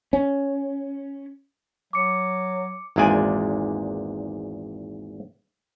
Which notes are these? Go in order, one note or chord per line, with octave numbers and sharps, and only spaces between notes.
C#4
F#3 D6 C#7
G#1 E2 A#2 G#3 D5 G#5